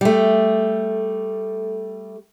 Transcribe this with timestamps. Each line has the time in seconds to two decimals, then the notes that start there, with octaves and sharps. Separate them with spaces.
0.01 G3 A3